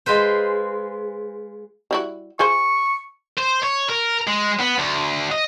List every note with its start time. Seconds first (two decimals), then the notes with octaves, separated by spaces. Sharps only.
0.06 G#3 F4 B4 C5
1.91 G3 E4 F#4
2.39 F4 G#4 C5 C#6
3.38 C5
3.63 C#5
3.90 A#4
4.27 G#3
4.59 B3
4.79 D2
5.32 D#5